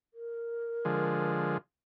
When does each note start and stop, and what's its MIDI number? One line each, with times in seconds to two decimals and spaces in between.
0.14 1.56 70
0.85 1.58 50
0.85 1.58 53
0.85 1.58 56